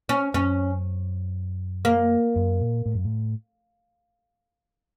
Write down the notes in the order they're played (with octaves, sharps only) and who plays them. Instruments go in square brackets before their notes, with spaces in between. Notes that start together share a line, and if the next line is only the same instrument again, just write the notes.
[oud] C#4
[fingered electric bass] F#2 [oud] C#4
[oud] A#3
[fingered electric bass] F#2
A#2
A2
F#2
A2